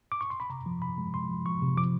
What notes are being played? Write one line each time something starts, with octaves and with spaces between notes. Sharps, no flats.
D6
C#6
C6
B5
C3 A#5
F3
C3 B5
G#3
C3 C6
F3
F3 C#6
C3
F3 D6